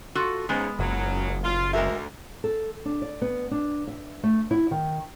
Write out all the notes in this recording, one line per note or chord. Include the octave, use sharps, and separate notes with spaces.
F4 F#4 A4
G#2 C#3 G#3 B3
F#1 A#2 C#3 F#3
F4
D2 G#3 A#4 E5
A4
D4
D5
B3
D4
E5
A3
E4
D#3